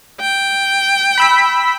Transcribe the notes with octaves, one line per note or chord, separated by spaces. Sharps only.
G5
B5 E6 B6